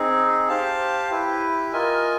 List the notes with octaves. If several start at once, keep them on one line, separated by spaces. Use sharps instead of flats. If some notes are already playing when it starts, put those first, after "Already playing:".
Already playing: C4 D#4 G#4
G4 C5 F5 A5
E4 G4 B4
F4 A#4 D#5 G#5